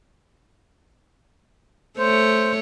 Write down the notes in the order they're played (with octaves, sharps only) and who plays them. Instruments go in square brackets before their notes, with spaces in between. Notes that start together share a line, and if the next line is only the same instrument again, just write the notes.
[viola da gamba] A3 C#5 [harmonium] C5